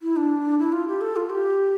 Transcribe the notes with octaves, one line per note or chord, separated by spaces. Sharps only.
E4
D4
E4
F4
G4
A4
F4
G4